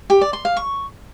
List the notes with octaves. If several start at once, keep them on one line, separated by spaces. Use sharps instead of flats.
G4
D5
C6
F5
C#6